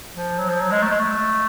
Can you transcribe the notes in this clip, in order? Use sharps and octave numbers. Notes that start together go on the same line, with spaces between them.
F3
F#3
F3
F#3
G#3
A3
G#3
A3